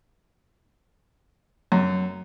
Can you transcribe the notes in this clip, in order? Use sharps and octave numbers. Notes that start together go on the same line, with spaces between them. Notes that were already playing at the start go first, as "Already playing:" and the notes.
F#2